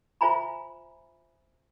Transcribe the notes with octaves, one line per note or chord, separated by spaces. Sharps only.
F4 C5 E5 G#5 A#5 B5